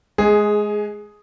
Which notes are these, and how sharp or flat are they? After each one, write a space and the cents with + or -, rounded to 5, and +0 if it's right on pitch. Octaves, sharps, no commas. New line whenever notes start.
G#3 +20 G#4 +0